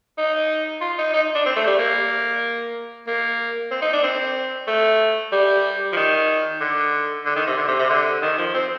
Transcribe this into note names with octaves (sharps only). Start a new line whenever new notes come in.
D#4
F4
D#4
D#4
D4
C4
A3
G3
A#3
A#3
C4
D#4
D4
C4
A3
G3
F3
D#3
D3
D3
D#3
C3
D3
C3
C3
D3
D#3
F3
C4